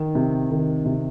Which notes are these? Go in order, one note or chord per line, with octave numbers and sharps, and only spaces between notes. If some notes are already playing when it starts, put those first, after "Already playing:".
Already playing: D#3
C3
D#3
C3